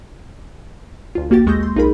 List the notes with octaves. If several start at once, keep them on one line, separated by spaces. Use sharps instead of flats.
D2 F4
A#1 A#3 F#4 G4 A6
D#2 G#3 C#6 E6 G6 A#6
C6
B1 D#4 F4 G#4 A#4 B5